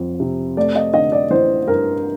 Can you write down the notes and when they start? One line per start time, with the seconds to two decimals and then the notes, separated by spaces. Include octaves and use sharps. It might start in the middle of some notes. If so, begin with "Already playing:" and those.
Already playing: F2
0.20 C3
0.57 A3 D5
0.75 D#5
0.94 D3 D#5
1.12 D5
1.30 A1 C5
1.68 G2 A#4